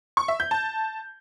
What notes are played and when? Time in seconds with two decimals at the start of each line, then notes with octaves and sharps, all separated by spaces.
0.17 C#6
0.28 E5
0.40 G6
0.51 A5